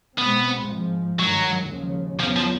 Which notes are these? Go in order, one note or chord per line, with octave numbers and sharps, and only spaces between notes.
B2 G#3 B3 C4
G#2 F3 G#3
G2 D#3 F#3 G#3
D#2 C#3 F3
E2 C#3 F3 F#3 B3
F3